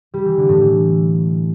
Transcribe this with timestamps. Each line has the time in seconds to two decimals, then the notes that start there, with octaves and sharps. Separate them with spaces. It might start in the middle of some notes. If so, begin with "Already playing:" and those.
0.14 G3
0.25 E3
0.37 D3
0.49 A2
0.61 E3